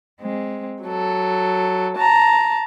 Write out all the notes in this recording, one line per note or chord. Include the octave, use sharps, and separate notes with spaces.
G#3 C4
F#3 A4
A5 A#5